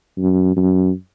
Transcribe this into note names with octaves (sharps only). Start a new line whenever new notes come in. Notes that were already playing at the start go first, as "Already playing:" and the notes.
F#2
F#2